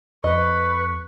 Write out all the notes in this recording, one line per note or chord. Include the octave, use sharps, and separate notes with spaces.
F2 B4 D#5 C#6